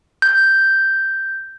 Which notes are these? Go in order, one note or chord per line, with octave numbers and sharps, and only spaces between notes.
G6